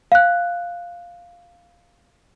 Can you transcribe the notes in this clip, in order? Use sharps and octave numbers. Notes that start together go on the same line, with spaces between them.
F5 F#6